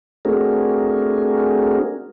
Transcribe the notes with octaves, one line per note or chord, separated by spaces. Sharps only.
A3 C4 D4 F#4 G#4 A#4